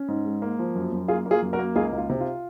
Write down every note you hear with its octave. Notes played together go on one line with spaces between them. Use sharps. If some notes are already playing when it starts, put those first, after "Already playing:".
Already playing: C#4
G#2
G#3
A#3
F3
F#2
F#2
A#3 F4 G#4
A#3
F4 G#4
F#2
F#4 A#4
A#3
C#2 F4 G#4
C#2 F4
C3
F4